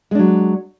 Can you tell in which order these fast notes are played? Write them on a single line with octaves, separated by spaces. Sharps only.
G#3 D4 F#3